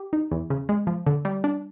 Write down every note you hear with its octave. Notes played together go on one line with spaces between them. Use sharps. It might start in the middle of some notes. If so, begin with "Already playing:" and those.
Already playing: G4
D#4
E2
C#3
G#3
F3
D3
G3
D4